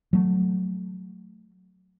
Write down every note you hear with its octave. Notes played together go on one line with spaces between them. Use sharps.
F#3 A3